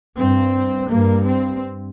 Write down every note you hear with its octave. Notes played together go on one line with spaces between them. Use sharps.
G2 C4
G2 A#3
C4